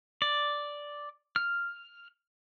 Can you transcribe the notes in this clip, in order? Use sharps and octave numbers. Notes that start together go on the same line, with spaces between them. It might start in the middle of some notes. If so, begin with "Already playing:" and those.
D5
F6